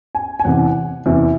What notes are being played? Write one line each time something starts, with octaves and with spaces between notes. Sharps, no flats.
G#5
G#5
E2 C3 E3 F#5
E2 C3 E3 E5